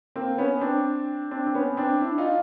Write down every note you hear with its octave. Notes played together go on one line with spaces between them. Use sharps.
A#3 C4
B3 C#4
C4 D4
C4 D4
C4
B3 C#4
C4 D4
D4 E4
D#4 F4